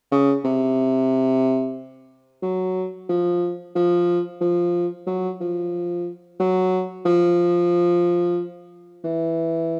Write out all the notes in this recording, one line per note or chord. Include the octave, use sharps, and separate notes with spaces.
C#3
C3
F#3
F3
F3
F3
F#3
F3
F#3
F3
E3